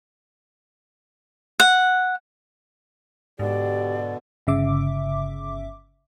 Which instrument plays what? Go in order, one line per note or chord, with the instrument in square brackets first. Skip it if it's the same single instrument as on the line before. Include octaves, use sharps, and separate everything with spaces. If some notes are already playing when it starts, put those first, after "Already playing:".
[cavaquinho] F#5
[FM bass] G#2 [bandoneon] B2 D3 [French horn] G4 [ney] D5
[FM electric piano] G1 C#3 E5 D6